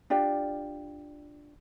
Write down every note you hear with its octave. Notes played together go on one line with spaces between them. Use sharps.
D4 F4 G4 D5